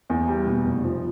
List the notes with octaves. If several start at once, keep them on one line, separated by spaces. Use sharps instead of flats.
E2
G3
B2
F1
F3